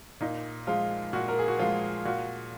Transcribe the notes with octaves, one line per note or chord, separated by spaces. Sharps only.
A#2 D#4
F3 G#3 F4
A#2 F#4
A#4
G#4
F#4
F3 G#3 F4
A#2 F#4